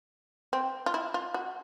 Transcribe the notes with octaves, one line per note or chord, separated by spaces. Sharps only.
C4
F4
E4
F4
F#4